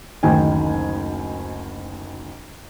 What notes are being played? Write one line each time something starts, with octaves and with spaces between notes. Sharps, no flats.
F#1 D2 D#3 G5 G#5